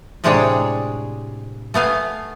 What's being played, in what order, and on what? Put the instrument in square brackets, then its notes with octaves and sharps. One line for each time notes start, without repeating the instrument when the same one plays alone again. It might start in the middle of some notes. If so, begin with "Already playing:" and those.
[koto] A2 C3 G#3 D4 G#4 C#5
A3 B3 F5 G#5